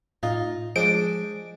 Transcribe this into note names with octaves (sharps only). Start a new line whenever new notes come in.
A2 D#4 F4
F3 G#3 D4 C5 D7